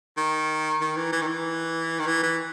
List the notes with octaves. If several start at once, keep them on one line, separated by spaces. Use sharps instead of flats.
D#3
D#3
E3
E3
D#3
E3
D#3
E3
E3